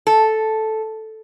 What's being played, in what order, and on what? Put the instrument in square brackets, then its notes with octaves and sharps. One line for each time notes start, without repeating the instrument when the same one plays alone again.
[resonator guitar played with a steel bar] A4